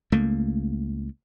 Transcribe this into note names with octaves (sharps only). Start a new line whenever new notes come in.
C#2 A3 A#3